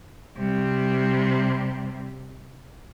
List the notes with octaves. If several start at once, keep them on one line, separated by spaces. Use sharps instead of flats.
C3 G3